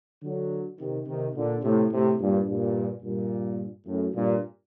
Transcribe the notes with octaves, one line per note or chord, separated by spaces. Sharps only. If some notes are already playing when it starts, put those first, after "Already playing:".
D3 F#3
C3 D#3
C3 D#3
A#2 D3
A2 C3
A2 C3
G2 A#2
G2 A#2
G2 A#2
F#2 A2
G2 A#2